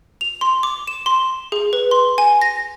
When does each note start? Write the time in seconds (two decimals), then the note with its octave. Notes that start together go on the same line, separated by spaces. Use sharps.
0.21 F7
0.41 C6
0.63 D6
0.87 E7
1.06 C6
1.52 G#4
1.73 B4
1.91 C6
2.18 G#5
2.42 A#6